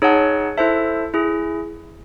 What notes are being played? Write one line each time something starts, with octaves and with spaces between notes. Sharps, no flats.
D#4 G#4 C#5 F#5 A5
E4 A4 C5 E5 A5
E4 G#4